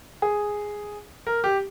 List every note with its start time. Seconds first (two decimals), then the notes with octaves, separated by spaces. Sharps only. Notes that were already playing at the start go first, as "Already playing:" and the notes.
0.22 G#4
1.27 A#4
1.44 G4